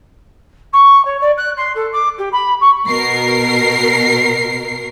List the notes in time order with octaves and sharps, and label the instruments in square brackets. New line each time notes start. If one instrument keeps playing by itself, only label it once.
[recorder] C#6
C#5
D5
F#6
C6
A4
D6
G4
B5
C#6
[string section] B2 A#4 C7